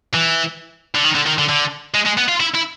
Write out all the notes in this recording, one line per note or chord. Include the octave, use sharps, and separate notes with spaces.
E3
D3
D#3
D3
D#3
D3
D3
G#3
G#3
B3
F4
E4
E4